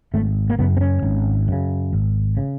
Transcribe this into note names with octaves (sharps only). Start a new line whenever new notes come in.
G#1 A3
A#3
F#2 C#3 B3
C4
C#4
G#1
F#2 C#3
G#1
C#3